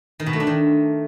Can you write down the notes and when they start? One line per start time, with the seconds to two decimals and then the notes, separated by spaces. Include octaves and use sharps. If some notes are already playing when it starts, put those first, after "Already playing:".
0.20 D#3
0.26 B2
0.33 A3
0.40 D4
0.47 D#3